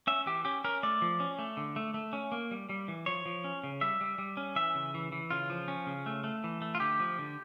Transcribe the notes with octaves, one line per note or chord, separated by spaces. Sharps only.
C#4 E5
E3 G4
C#4 G4
C#4 A#4
A3 D5
F3
C#4
A3
D3
A3
A3
C#4
A#3
G3
G3
E3
F3 C#5
F3
C#4
C#3
G3 E5
G3
G3
C#4
E3 E5
C#3
E3
E3
C#3 F4
F3
C#4
C#3
A3
A3
E3
A3
F4
D3 G4
F3
D3